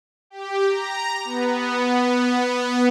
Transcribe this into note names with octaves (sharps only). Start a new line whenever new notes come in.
G4
A#5
B3